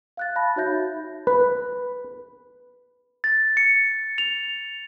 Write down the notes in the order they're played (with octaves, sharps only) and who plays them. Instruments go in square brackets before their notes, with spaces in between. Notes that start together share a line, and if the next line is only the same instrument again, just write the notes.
[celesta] F5 F#6 A6
F5 A5 B5 A#6
D#4 F#4 C#5 E5 G6 A#6
[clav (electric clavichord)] B4
[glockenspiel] A6
C#7
F7